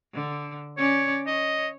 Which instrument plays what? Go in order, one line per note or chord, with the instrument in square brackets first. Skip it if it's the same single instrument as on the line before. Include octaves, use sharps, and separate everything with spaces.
[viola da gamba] D3
[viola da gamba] C#4 D5 [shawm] C#5
[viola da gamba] C#5 [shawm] D#5